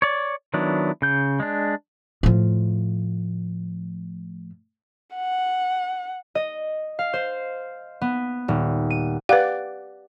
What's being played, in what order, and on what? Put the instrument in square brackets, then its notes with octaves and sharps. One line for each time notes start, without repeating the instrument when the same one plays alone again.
[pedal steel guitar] C#5 D5
D#3 F#3 B3 D4 E4
C#3 G6
G#3 D4
[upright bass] A2 F3
[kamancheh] F#5
[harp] D#5
F5
C5
B3
D#1
D#7
[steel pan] G4 D5 F#5 [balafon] B4 F5